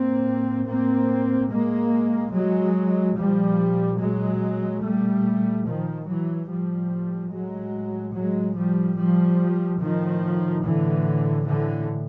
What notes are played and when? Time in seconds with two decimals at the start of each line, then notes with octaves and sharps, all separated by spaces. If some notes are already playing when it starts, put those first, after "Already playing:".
Already playing: A2 A#3 C4
0.67 A#3 C4
1.50 G#3 A#3
2.33 F#3 G#3
3.16 A#2 F3 G3
3.99 F#3 G#3
4.82 G3 A3
5.65 D#3 F3
6.07 E3 F#3
6.49 A2 F3 G3
7.31 F#3 G#3
8.14 F#3 G#3
8.56 F3 G3
8.97 F3 G3
9.80 A2 D#3 F3
10.64 D3 E3
11.47 D3 E3